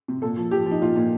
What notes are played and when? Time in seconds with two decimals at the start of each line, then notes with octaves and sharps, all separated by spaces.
0.08 C3
0.22 A#2 A4
0.37 F3
0.51 F3 G4
0.66 F3
0.71 D#4
0.81 A#2 F4
0.96 A#2